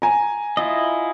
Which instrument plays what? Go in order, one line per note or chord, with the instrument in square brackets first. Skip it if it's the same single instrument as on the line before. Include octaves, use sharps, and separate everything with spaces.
[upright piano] G#5 A#5
[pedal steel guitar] E4 F4 D#5